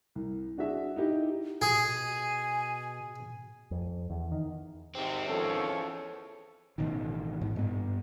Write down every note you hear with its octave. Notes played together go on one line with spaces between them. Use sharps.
C2
D4 F#4 G#4 E5
D#4 E4 G4 D#5
B2 G#4 G#5
F2
E2
D#3
G#2 C3 D#3 C4
E2 F3 C#4 A4 C#5
A1 B2 D#3
G#2
G2 B3